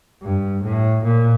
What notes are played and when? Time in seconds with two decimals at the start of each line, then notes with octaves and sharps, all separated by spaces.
0.22 G2
0.63 A2
1.05 A#2